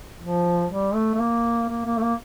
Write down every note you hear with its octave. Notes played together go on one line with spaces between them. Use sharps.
F3
G3
A3
A3
A#3
A#3
A#3
A3
A#3